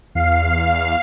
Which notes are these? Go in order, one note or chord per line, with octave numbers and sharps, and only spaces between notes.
E2 F5 C7